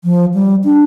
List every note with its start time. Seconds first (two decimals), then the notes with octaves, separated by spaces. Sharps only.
0.04 F3
0.34 G3
0.64 D4